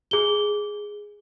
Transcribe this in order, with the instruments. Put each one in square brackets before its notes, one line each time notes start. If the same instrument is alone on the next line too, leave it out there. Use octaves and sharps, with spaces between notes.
[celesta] G#4 G7